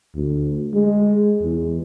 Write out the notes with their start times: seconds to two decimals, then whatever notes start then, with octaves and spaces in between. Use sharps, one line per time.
0.15 D2
0.74 G#3
1.42 E2